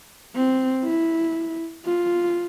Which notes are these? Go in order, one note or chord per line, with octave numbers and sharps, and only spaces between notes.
C4
E4
F4